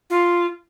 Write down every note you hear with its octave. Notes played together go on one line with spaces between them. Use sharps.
F4